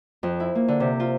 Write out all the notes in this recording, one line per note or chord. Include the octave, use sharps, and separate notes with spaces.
F2
E4
A#3
D3
C3
F4